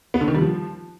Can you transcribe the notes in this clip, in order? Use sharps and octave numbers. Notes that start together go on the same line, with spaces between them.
B3
D3
D#3
G3
F3